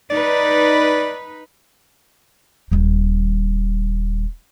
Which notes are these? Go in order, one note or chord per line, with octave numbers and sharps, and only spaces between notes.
D#4 B4 D5
D#1 G3